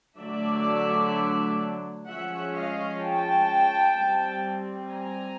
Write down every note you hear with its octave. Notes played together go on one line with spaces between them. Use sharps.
D3 F#3 A3 D4 D5 E5
F3 G#3 C#4 E5 F#5
D#5 F5
G5 A5
G3 C4
G#5 A#5